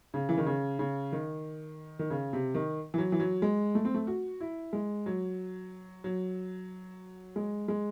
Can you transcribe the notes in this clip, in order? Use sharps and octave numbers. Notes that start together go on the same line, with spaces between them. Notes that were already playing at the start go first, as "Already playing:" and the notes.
C#3
E3
D#3
C#3
C#3
D#3
D#3
C#3
C3
D#3
E3
F#3
E3
F#3
G#3
A3
C4
A3
F#4
E4
G#3
F#3
F#3
G#3
G#3